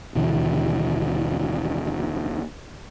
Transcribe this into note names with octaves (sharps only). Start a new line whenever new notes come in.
D#2 B2 D3 E3